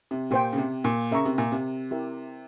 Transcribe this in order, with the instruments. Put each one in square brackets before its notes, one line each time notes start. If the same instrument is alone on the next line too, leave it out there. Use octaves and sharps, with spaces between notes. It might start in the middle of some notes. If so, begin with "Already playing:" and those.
[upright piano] C3
[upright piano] A#2 [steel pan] G4 C5 G5
[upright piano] C#3
C3
A#2
[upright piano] C#3 [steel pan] A#4 E5 A#5 C#6
[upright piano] C3
A#2
C3
[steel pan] E4 G4 A#4 E5